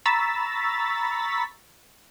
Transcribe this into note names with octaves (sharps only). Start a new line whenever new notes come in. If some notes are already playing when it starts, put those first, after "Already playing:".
A#5 B5 C#6 E6 A6 B6